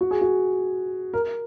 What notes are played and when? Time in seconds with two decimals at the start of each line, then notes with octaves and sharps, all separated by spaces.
0.01 F#4
0.11 G#4
0.21 F#4
1.14 A#4